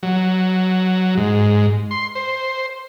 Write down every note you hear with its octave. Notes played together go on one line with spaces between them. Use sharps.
F#3
G#2
C6
C5